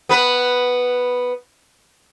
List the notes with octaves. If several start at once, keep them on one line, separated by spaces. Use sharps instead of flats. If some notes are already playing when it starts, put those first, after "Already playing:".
B3 B4